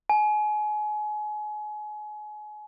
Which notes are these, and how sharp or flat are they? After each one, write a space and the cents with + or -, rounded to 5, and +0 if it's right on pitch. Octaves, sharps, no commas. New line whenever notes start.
G#5 +30